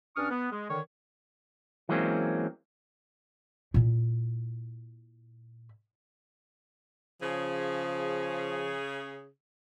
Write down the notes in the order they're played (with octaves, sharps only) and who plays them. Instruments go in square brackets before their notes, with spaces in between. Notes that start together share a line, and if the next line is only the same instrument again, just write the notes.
[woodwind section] G2 C#4 D4 C#6 D#6 F6
B3
G#3
D3 D#3 C#5
[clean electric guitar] E3 F#3 G#3 A#3 C4 C#4
[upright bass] A#2 E4
[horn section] C#3 G#4 [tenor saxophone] F3